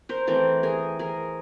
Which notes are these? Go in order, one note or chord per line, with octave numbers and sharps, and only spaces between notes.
A#4 C5
E3 A3 C4 A#4 C5
G#4 A#4
G#4 A#4